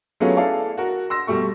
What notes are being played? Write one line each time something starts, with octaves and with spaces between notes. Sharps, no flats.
F#3 A3 B3 C#4 F4 G#4
E4 G#4 A4 D5 F5
F#4 A#4
C6 E6 A#6
B2 G3 A3 C#6